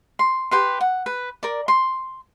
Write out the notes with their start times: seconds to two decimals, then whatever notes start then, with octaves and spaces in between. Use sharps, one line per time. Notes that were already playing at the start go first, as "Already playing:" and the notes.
0.19 C6
0.51 G4 B4 C6
0.81 F#5
1.06 B4
1.43 A#4 D5
1.68 C6